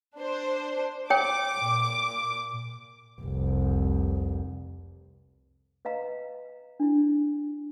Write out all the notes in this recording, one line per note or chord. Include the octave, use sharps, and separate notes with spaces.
D4 C5
C#5 G5 D6
A#2
F1 C2
B4 D#5 F5 A#5
D4 E4